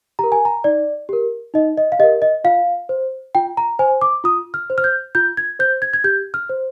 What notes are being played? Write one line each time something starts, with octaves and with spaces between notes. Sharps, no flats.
G4 A#4 A#5
G#5
A#5
D#4 D5
G4 A#4
D#4 D#5
D#5
F5
G4 A#4 D#5
D#5
F4 F5
C5
F4 G5
A#5
C5 G#5
D6
F4 D#6
F6
C5
F6
G6
F4 G6
G#6
C5 G6
G#6
G#6
G4 G6
F6
C5